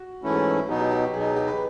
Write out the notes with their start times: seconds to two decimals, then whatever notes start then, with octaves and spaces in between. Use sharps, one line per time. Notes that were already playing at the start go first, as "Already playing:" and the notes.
Already playing: F#4
0.23 G#2 E3 A3 C#4 E4
0.69 B2 F#3 B3 D#4 G4
0.80 G4
0.91 G4
1.14 B2 F#3 B3 D#4 G#4
1.24 G#4
1.36 G4
1.48 B4